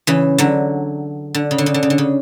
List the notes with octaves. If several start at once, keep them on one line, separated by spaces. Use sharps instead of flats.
C#3 E3
D3 F#3
D3
C#3
D3
C#3
D3
C#3
D3
C#3